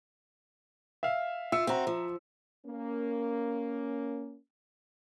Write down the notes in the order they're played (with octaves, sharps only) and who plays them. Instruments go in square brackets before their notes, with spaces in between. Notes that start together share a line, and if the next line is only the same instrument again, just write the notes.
[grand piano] E5 F5
[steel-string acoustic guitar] F4 [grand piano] E5 E6 C#7
[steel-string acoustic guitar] C4 F#4 [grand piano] E5 A#5
[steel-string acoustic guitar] F3
[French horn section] A#3 C#4